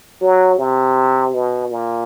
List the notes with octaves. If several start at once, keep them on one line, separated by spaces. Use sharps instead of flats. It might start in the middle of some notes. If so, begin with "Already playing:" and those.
F#3
C3
B2
A#2